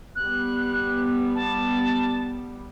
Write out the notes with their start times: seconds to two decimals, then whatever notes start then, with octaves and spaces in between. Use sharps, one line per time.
0.16 G3 B3 F#6
1.35 A5